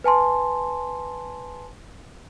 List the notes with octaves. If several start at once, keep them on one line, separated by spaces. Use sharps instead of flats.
B4 G#5 A5 C6